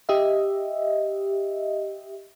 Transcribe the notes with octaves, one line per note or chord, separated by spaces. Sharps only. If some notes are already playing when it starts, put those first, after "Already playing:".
G4 D#5 E5